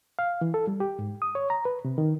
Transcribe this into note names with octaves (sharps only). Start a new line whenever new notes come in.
F5
E3
A4
G3
G4
G#2
D#6
C#5
A#5
B4
C3
D#3